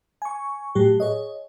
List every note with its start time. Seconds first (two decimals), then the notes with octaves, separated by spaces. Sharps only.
0.22 G#5 C#6
0.75 A2 F#3 G4
1.00 G#4 C#5 D#5